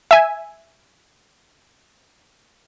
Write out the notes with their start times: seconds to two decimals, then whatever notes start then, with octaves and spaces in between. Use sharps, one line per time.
0.11 E5 G#5